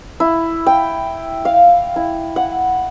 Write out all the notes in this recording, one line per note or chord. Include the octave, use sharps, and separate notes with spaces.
E4
G5
F5
E4
F#5